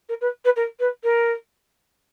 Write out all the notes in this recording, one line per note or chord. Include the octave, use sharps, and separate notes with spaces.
A#4
B4
B4
A#4
B4
A#4